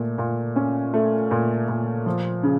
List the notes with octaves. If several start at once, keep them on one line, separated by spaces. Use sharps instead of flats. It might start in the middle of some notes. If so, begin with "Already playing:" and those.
Already playing: A#2 A3
A#2
C#4
A3
A#2
A#2
F3
C#3